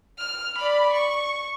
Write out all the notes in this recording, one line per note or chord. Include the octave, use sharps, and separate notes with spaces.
F6
D5 B5
C#6